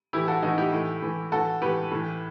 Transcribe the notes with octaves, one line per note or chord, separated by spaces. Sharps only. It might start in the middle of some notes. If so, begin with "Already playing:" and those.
A2 E3 E4 G4
F#4 A4
A2 E3 D#4 F#4
E4 G4
A2 E3
A2 E3
A2 E3 F#4 A4
A2 E3 G4 B4
A2 E3